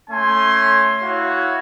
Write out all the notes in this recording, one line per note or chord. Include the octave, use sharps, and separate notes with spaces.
A3 C#4 G#5 C6
E4 F#4 C#5 F5